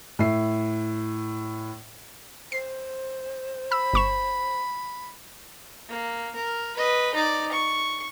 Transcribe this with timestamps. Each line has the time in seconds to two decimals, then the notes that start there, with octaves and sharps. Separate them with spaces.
0.19 A2 E5 C7
2.52 C5 C7
3.72 B5 E6
3.94 G1 C#6 E7
5.89 A#3
6.35 A#4
6.77 B4 D#5
7.14 D#4 D5
7.52 C#6